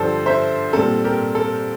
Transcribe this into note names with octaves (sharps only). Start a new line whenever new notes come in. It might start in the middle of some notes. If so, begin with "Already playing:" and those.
Already playing: G2 D3 F3 A4 C5
C5 E5
A#2 G3 C4 A4
G4 A#4
A4